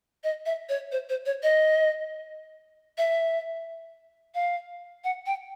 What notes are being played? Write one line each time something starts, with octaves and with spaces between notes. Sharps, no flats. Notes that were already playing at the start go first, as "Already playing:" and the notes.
D#5
E5
C#5
C5
C5
C#5
D#5
E5
F5
F#5
G5